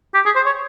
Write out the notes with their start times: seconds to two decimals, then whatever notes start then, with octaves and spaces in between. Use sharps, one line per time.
0.15 G4
0.26 G#4
0.36 C5
0.46 C#5